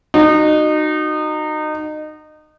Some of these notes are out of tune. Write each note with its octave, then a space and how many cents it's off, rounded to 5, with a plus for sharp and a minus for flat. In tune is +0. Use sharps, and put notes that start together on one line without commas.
D#4 -25 F#4 +0